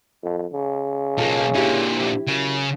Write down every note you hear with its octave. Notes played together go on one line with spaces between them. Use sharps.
F2
C#3
B1 A#3 F4 A4
A#2 D3 E4 G4
C3
F#2 C#3